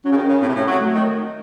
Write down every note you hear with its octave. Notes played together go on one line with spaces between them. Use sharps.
F#3 C#4
C#3
D#3
C#3
A2 C4
C3
A2
F#3
A3
D#3